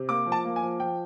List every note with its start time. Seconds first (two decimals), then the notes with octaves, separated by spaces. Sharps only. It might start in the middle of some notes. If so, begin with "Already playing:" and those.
Already playing: C3
0.09 A#3 D6
0.26 F3
0.32 A5
0.44 A#3
0.56 G#5
0.62 F3
0.80 F3 G5